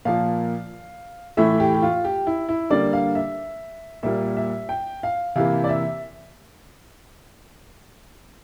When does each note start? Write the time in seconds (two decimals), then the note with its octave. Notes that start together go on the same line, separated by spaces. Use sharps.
0.05 A#2 F3 A#3 F5
1.37 A2 E3 A3 E5
1.60 G4
1.74 G4
1.82 F4
2.05 G4
2.27 E4
2.49 E4
2.70 D3 G3 A#3 D5
2.93 F5
3.15 E5
4.03 A#2 G3 A#3 E5
4.37 E5
4.69 G5
5.03 F5
5.36 C3 E3 A#3 F5
5.64 D5
5.69 E5